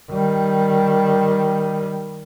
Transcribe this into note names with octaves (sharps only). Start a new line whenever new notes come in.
D#3 G3